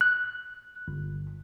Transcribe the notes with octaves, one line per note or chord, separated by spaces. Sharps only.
F#6
G1